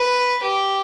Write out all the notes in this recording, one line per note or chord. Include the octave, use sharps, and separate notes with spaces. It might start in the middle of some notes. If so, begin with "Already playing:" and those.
Already playing: B4
G4